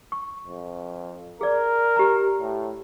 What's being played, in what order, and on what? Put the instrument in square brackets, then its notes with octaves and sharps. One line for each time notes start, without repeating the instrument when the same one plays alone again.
[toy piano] C#6
[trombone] F2
[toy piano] G#4 D5 [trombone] A#4
[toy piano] G4 A#5
[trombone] A2